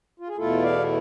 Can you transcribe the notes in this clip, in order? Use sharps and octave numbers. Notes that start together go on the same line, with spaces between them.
F4
G#4
E2 B2 A3 E4 F4 A4
D5 F5